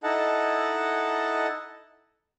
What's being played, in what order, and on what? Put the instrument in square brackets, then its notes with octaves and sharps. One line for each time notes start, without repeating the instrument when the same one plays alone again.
[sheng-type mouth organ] D#4 E4 A4 D#5 F#5 A5